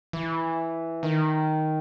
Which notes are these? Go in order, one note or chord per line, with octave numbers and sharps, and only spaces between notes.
E3
D#3